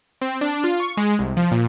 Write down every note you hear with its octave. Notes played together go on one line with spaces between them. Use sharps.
C4
D4
F4
C#6
G#3
C2
F3
A#2